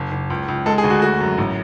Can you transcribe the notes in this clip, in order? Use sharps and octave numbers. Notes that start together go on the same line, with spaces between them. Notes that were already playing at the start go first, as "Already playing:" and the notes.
Already playing: F#1
F#1
C#2
C#2
G#3 A4
G#4
D2
F#4
A3 F#4
F#2
A1